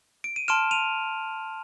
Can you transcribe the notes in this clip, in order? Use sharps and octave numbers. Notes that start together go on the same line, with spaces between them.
D7
D#7
A5 C6 F6 D7 E7
D#7 F7